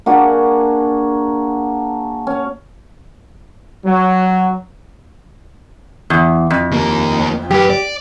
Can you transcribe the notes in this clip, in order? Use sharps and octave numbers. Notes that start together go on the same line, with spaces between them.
A#3 D4 F#4 G#4
C#4
F#3
E2
F2
D#2 A#3
F#2 G4 B4
D5